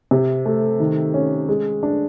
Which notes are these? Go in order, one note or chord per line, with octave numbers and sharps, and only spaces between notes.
C3
A3
D#3
C#4
G#3
D4